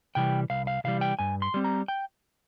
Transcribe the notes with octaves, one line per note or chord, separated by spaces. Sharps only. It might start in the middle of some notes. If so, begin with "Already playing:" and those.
C3 E3 G3 G5
C2 F5
F5
C3 E3 G3 F5
G5
G2 G#5
C6
G3 C4
A#5
G5